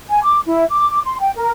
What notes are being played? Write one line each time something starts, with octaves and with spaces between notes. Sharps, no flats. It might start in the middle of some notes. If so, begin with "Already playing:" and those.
G#5
D6
E4
D6
C6
G5
A#4